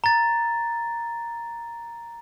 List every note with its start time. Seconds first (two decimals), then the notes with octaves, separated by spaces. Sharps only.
0.04 A#5 A6